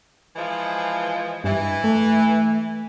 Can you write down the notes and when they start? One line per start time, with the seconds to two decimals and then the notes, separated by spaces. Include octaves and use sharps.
0.35 E3 F3 G#3
1.44 G2 E3
1.84 A3